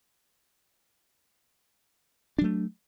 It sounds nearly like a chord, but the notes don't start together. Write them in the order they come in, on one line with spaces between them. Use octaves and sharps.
D4 F#3 A3